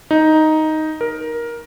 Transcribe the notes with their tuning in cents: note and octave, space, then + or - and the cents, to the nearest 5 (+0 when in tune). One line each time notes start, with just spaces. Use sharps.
D#4 +5
A#4 +15